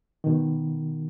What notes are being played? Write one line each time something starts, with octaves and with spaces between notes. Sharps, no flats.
B2 D#3